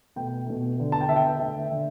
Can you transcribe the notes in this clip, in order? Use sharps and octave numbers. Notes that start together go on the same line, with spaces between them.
B2 A3 G5
B2 A3
D3 B3
A5
G5
D3 B3 E5
G5
D3 A3 E5
D3 A3